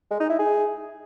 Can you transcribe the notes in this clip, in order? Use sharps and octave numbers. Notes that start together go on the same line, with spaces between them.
G#3
D#4
E4
G#4